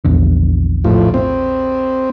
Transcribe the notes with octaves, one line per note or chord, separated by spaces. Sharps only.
A#1 E2 D3
A2 F3
C4